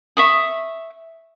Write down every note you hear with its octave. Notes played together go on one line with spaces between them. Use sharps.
E5 C#6 D#6